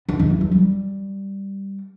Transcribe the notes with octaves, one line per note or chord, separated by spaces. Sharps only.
D3
D#3
E3
F#3
G3